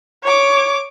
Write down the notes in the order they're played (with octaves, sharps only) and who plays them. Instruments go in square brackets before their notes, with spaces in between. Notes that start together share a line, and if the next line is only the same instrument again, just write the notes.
[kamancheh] C#5 D6